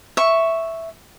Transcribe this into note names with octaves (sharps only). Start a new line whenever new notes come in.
E5 C#6